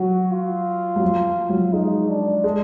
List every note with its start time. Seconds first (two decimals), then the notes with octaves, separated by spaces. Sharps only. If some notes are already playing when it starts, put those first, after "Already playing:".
Already playing: F#3 F#4
0.31 F4
0.96 F#3
1.01 F3
1.49 F#3
1.73 G#3 D#4
2.09 D4
2.44 G#3